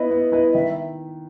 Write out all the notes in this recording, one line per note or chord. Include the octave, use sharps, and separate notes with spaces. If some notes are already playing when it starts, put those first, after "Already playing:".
Already playing: B3 E4 B4 D#5
B3
E4 B4
D#3 E5